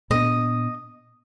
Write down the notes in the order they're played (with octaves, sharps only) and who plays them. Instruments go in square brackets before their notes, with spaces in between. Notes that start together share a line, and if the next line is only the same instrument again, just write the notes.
[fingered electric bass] A#2 G3 B3 D4 [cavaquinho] D#5